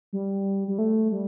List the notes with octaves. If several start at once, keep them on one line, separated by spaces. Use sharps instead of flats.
G3
G3
A3
G3